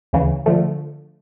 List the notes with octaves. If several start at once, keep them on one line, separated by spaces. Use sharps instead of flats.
D2 C#3 E3
D3 F3 A3